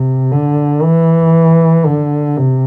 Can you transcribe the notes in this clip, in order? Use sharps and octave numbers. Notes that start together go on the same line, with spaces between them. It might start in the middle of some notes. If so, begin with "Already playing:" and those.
Already playing: C3
D3
E3
D3
C3